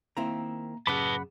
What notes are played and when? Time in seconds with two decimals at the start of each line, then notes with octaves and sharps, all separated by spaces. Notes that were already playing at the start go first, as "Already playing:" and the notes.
0.17 D#3 A#3 C4 E4 A#5
0.87 F#2 C#3 B4 F#5 A5 B5 D6